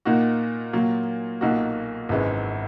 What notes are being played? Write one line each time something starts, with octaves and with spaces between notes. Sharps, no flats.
A#2 A#3 D#4 F#4
A#2 F#3 A#3
B1 A#2 A#3 D#4 F#4
G#1 F#2 E3 G#3